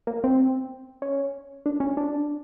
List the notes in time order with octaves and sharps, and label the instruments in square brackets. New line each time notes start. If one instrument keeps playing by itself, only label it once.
[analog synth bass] A#3
C4
C#4
D4
C#4
D4